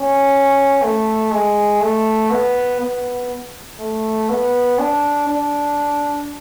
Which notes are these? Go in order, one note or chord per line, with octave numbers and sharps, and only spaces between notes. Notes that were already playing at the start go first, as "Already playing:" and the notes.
Already playing: C#4
A3
G#3
A3
B3
B3
A3
B3
D4
D4